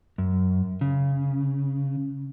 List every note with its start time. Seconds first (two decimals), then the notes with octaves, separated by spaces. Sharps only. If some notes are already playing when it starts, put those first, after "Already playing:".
0.18 F#2
0.81 C#3